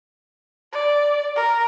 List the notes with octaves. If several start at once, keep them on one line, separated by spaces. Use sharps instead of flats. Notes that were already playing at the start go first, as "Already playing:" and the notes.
D5
A#4